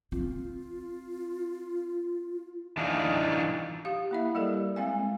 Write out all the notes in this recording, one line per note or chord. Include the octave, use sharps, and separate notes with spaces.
C4 F4
E3 D4 D#4 F4
G4 F5
A#3 E4 E5
G3 G4 A4 A#4 D5
G#3 C4 F5 G#5